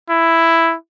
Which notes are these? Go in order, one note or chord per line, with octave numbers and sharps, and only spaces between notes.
E4